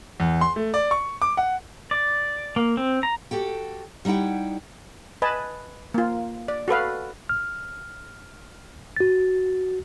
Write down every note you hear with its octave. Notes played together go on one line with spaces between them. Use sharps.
E2
C6
A3
D5
C#6
D6
F#5
D5
A#3
C4
A#5
F#4 G4 A4 G5
G3 D#4 E4 F#5 G5
B4 D#5 G#5 A5 B5
A#3 F4
D5
F#4 A4 B4 F5
F6
F#4 A6